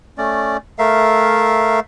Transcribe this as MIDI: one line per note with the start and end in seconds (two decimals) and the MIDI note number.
0.18 0.57 57
0.18 0.57 61
0.18 0.57 74
0.79 1.80 57
0.79 1.80 70
0.79 1.80 76
0.79 1.80 77